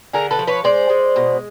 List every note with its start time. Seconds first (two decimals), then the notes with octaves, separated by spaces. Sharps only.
0.13 D3 G#4 A#4
0.31 A4 B4
0.39 F3
0.47 B4 C#5
0.64 G#3 C5 D5
0.90 G#3
1.16 B2